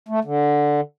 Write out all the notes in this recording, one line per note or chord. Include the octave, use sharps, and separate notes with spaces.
A3
D3